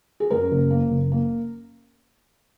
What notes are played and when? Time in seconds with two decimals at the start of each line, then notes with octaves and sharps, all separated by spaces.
0.20 G#4
0.30 F#2 A#4
0.51 F#1
0.70 A#3
0.90 F#1
1.12 A#3